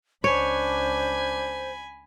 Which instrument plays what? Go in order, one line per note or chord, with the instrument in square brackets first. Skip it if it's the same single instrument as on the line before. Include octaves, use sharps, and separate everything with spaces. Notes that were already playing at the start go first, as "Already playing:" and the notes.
[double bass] C#2 D4 [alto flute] C5 [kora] C#5 [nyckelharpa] G#5 B5